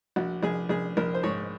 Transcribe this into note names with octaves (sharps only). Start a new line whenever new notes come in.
A#1 F#4
A#1 G#4
A#1 G#4
A#1 A#4
C5
G#2 C#5